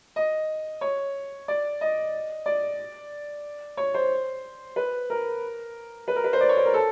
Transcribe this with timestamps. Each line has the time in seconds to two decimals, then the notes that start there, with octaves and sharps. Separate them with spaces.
0.16 D#5
0.81 C#5
1.48 D5
1.81 D#5
2.46 D5
3.77 C#5
3.94 C5
4.76 B4
5.10 A#4
6.08 B4
6.16 A#4
6.24 B4
6.33 C5
6.41 D5
6.49 C#5
6.57 C5
6.65 A#4
6.74 A4